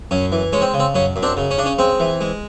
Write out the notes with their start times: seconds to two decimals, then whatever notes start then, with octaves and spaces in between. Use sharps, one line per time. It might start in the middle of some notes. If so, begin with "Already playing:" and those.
0.11 F#2 C#4
0.32 E3
0.53 G#3 C#4
0.62 C4
0.74 C#3
0.80 C4
0.95 F#2 C#4
1.16 F#2
1.22 C4 D4
1.37 C#3
1.51 C#4
1.58 C#3 D4
1.66 C#4
1.79 G#3 C4
2.00 E3
2.21 G#3